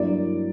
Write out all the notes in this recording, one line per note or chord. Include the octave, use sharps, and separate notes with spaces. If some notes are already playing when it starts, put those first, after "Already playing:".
Already playing: G2 F#3 A#3 E4 D5